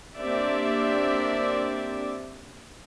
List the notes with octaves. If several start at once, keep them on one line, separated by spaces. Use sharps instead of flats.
A#3 C4 D4 G4 D5 E5